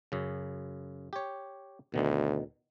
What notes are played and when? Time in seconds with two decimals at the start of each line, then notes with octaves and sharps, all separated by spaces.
0.12 F#2 C#3
1.13 G4 C#5
1.94 D2 B2 D#3